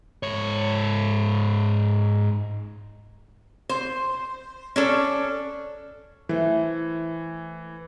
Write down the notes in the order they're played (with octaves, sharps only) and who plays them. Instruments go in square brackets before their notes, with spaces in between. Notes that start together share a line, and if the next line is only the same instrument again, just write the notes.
[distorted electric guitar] G#2 C#5
[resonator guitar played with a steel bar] C5
C#4 D4 A4
[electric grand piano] E3 [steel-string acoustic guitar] A3 C5